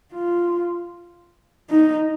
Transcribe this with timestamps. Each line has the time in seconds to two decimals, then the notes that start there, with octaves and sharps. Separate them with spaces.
0.13 F4
1.70 D#4